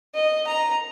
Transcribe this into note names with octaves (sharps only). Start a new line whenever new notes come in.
D#5
A#5